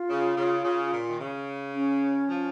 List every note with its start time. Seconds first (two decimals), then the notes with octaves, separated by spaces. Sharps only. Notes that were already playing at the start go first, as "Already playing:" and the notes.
Already playing: F4
0.09 C#3
0.36 C#3
0.64 C#3
0.92 A#2
1.09 D#3
1.19 C#3
1.74 C#4
2.29 F3